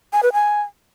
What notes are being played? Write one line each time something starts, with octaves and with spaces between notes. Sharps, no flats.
G#5
B4
G#5